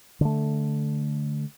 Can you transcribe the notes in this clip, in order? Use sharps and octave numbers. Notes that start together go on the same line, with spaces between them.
D3 A3